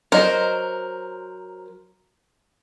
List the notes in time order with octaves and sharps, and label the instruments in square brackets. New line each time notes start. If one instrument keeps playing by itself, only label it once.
[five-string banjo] F#3 D#5 [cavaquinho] A#4 C5